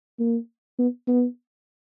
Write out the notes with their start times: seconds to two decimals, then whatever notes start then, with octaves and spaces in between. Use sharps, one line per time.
0.19 A#3
0.79 B3
1.07 B3